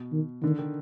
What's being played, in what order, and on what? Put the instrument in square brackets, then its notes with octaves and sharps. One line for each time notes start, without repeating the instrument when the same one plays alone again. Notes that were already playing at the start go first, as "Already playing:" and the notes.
Already playing: [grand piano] B2
[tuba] D#3
[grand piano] D3 [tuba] D#3
[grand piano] D#3